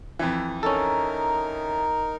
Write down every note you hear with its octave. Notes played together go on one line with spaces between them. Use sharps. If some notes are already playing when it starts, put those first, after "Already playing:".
F2 E3
C#4 D#4 A4 A#4